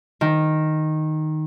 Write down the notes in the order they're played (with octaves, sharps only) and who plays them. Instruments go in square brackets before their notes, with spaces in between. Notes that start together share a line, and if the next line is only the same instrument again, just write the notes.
[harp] D#3